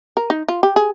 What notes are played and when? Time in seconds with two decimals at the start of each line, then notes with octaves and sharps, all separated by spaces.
0.17 A#4
0.30 D#4
0.48 F4
0.63 G4
0.76 G#4